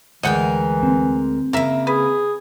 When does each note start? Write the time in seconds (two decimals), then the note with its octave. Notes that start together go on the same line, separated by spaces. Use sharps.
0.23 D2 E3 G#3 A#4 D#5 F#5 G5
0.83 C4
1.53 C#3 A#3 A#4 E5
1.87 G#4 B4